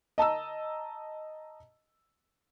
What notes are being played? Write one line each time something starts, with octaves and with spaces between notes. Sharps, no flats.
D#5 A5 A#5 E6